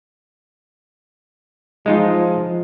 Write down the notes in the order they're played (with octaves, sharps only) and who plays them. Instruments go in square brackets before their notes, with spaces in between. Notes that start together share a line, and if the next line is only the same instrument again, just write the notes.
[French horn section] F3 [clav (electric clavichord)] G#3 D#4 F4